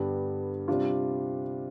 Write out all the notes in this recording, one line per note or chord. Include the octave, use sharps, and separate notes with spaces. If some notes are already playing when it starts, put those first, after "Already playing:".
Already playing: G2 D3 G3 B3
C3 G3 D4 F4